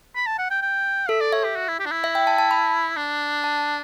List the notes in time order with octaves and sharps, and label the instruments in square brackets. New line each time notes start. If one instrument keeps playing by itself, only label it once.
[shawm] B5
A5
F#5
G5
G5
[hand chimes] A4 [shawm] E5
[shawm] D5
[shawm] C#5 [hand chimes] E5
[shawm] G4
F#4
E4
G4
D4
E4
[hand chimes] E5
G5
A5
A5
B5
[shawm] D4
[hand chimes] A5